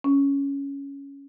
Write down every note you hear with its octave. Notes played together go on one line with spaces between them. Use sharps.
C#4